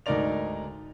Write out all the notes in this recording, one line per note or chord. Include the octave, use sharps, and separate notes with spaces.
D2 G#2 D#4 A#4 D5 F7